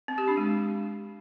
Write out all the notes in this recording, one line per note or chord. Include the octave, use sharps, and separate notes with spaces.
C4
G4
D4
G#3